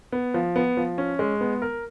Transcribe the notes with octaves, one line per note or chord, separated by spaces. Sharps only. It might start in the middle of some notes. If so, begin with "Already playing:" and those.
B3
F3
B3
F3
C#4
G#3
B3
A#4